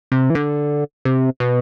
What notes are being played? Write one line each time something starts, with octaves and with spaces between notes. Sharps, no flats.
C3
E3
D3
C3
B2